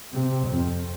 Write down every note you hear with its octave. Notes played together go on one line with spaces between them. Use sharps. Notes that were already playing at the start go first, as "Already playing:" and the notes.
C3
F2